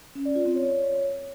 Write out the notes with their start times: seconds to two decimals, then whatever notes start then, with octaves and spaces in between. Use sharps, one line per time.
0.15 C#4
0.25 D5
0.35 F4
0.45 C4
0.56 C#5